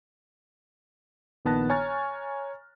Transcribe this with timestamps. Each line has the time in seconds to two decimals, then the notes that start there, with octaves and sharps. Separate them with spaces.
1.45 A#1 D#3 B3 A5 F#6 A#6
1.70 C#5 G#5 A#5 C#6 F6 A6